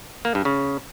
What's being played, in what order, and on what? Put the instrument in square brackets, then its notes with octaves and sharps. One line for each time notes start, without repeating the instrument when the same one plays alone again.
[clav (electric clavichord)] A#3
G2
C#3